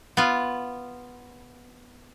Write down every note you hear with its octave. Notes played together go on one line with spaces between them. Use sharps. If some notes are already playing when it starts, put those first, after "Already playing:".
B3 F4